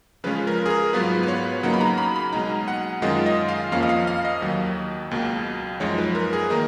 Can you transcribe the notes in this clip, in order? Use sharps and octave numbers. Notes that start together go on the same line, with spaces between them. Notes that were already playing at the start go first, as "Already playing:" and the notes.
C#3 F3 G#3 C#4 F4 B4
A#4
G#4
A#4
G#2 F#3 B3 F4 B4
B4
C#5
C#3 F#3 A#3 D#4 F#5
B5
A#5
B5
B5
B2 G#3 D#4 A#5
F#5
F#2 D#3 G#3 C#4 F4 D#5
D#5
F5
F2 F3 A#3 C#4 F5
D#5
F5
F5
D#5
D#2 D#3 F#3
C#2 B2 A#3
F#2 F3 G#3 D#4 C#5
B4
A#4
G#4
D#3 A#3 D#4 A#4